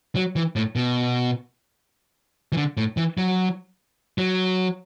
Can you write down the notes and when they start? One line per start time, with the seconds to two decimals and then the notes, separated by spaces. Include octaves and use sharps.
0.16 F#3
0.36 E3
0.56 A2
0.76 B2
2.52 E3
2.57 D3
2.77 A2
2.97 E3
3.18 F#3
4.18 F#3